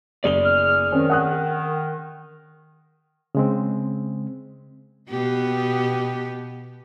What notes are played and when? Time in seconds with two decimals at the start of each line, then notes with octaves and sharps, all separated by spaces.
0.24 F#1 G#4 D5 F7 G7
0.46 F6
0.92 D#3 C4 C#4
1.10 F#5 D#6 F#6
3.35 C#3 G#3 C4
5.10 B2 B3 G4